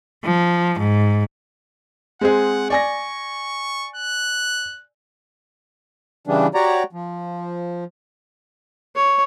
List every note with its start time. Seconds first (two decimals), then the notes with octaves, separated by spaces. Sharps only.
0.24 F3
0.78 G#2
2.21 G#3 C4 G#4 F#5
2.70 D5 G#5 C#6 A#6
3.96 F#6
6.27 C#3 E3 G3 D4
6.54 F#4 G4 C#5 D5 A#5
6.93 F3
8.95 C#5